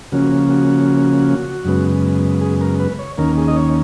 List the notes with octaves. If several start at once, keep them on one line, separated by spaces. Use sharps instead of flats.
C#3 F3 A#3 C#4 F#4
F#4
F#2 C#3 G#3 B3
G#4
A#4
B4
C#5
D#2 D#3 A#3 C#4 A#4
G#4
D#5
C#5